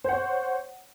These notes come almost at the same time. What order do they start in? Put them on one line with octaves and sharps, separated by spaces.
C5 F#5 C#5